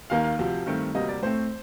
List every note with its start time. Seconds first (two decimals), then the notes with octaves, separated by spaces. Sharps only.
0.10 D#2 D#3 A#3 F5
0.24 F5
0.39 D2 C3 F3
0.66 G2 D#3 A3 C4
0.94 D2 C3 G3 A#3 D#5
1.09 D5
1.22 A2 A3 C4 C5